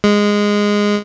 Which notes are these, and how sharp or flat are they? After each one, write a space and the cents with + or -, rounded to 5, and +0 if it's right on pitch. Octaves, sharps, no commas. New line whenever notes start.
G#3 -10